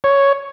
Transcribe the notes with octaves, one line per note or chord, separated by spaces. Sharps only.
C#5